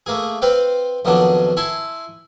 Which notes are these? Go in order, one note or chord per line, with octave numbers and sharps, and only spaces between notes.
A3 A#3 G#4
C4 B4 C5 F5 G5
F2 B2 D#3 F#3 D4
E4 G#5 A5 C6